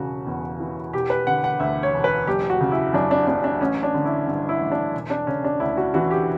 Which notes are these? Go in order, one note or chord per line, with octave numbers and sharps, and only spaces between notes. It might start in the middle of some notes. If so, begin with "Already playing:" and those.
Already playing: E1 C#3 F#4
E2
E3
E1 G4
B4
D3 F#5
F#5
D2 E5
C#5
E1
B4
F#1 G4
F#4
C#3
E4
F#2 D4
D4
F#1 D4
D4
A1 C#4
D4
D3
E4
G2
E4
A1
D4
E1
D4
C#3 C#4
D4
D2 E4
F#4
E3 F#4
G4